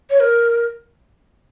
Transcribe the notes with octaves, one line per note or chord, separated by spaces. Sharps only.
C#5
A#4